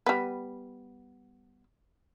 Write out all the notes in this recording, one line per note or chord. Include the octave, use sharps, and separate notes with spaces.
G3 B3